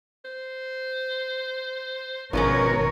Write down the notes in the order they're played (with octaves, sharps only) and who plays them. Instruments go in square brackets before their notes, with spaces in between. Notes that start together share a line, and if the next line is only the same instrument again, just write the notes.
[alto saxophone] C5
[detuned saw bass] G#1 [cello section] B2 A#4 C#5 [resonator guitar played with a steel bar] F3 G#3 C#4 [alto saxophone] B3